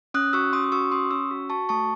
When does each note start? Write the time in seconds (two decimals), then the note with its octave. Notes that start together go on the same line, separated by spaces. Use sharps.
0.14 C#4 D#6 F#6
0.33 F#4 C#6 E6
0.53 C#4 C6 D#6
0.64 D#6
0.72 F#4 C#6 E6
0.91 C#4 C6 D#6
1.11 C#4 C#6 E6
1.31 F#4
1.50 F#4 A5 C#6
1.69 A3 A5 C#6